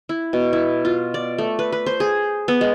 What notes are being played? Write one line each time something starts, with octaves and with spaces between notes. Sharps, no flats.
E4
B2
E4
F4
D5
A3
B4
B4
C5
G#4
B3
G#3